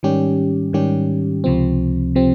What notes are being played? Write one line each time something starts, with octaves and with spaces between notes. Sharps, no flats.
G#2 D#3 G3 C#4 G4
G#2 D#3 G3 C#4 G4
C#2 C3 F3 C4
C3 F3 C4